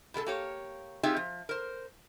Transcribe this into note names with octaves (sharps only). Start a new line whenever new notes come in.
B2 G#3 A#3 A4
A#3 G4 C#5
C4 D#4 F4 G4 G#4 E5
F3
A#4 C5